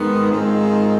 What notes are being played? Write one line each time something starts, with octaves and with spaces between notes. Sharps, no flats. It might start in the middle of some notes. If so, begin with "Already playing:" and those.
Already playing: G#2 D#3 G#3 B3
G#2 D#3 G#3 C4 F4